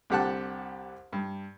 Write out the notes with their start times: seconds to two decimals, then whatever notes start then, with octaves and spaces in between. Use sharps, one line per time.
0.10 C2 D3 G4 F#5 A5 F#6
1.13 G2